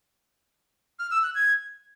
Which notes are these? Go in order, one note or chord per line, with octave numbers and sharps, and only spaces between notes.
F6
E6
F#6
G#6